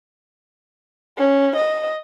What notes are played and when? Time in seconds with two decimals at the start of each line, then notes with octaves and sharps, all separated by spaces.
1.18 C#4
1.56 D#5